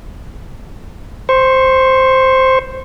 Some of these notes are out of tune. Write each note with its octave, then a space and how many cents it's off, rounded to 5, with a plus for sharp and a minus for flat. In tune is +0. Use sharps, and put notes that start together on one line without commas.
C5 +0 C#6 -25